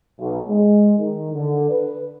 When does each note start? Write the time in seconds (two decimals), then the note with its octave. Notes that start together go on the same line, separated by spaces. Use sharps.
0.19 B1
0.49 G#3
0.98 D#3
1.34 D3
1.71 B4